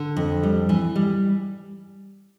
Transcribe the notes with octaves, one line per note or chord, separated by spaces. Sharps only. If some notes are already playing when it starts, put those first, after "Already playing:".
Already playing: D3
F2
G3
E3
G3